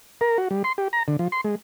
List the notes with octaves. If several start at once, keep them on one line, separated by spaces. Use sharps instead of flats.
A#4
F#4
G3
C6
G4
A#5
D3
F3
C6
G#3